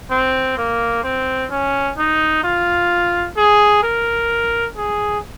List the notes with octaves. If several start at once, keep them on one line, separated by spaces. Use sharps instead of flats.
C4
A#3
C4
C#4
D#4
F4
G#4
A#4
G#4